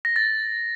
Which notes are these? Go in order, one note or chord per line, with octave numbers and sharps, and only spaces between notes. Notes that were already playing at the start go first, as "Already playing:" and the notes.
A#6
A6